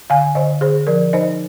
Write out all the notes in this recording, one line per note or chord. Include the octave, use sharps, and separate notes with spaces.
D3 F5 G#5
D3 C5 D#5
D3 G#4 C5
F3 A#4 D5
D#4 C5 D#5